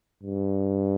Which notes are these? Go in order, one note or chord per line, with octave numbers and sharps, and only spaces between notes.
G2